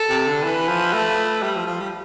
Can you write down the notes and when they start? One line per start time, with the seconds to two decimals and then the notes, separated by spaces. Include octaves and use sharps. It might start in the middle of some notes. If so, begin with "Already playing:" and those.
Already playing: A4
0.09 C3
0.27 D3
0.43 E3 B4
0.68 F3
0.93 A3
1.43 G3
1.55 F3
1.67 F3
1.80 G3